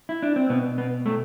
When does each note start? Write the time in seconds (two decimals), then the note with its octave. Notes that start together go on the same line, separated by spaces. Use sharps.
0.09 E4
0.23 D4
0.36 C4
0.49 B2 B3
0.78 B3
1.06 A3